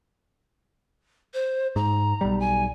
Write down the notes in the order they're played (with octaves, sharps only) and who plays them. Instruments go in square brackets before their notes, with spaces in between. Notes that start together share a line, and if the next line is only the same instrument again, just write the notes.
[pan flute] C5
[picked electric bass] G#2 [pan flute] A#5
[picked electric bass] B1 G3
[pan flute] G#5